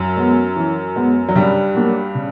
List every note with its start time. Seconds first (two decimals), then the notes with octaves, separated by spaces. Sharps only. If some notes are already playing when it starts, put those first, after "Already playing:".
Already playing: F#2 F#3
0.17 G#3 B3
0.56 E3
0.96 G#3 B3
1.29 F#3
1.35 G2 C#3 G3
1.75 F#3 A#3 D4
2.15 C#3